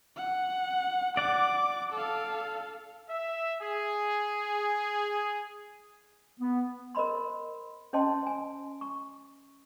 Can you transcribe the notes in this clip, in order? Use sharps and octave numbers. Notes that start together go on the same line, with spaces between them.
F#5
D5 F#5 D6
A4 F5
E5
G#4
B3
A#4 C5 D#5 B5 C6
C#4 C5 D#5 G5 A5 C6
G#5
C#6